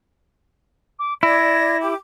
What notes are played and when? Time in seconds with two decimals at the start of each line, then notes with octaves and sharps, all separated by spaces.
0.99 D6
1.23 E4 D5 G#6 A#6
1.82 G4 D6